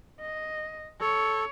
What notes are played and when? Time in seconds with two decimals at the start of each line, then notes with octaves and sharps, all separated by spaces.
0.21 D#5
1.01 A4 C#5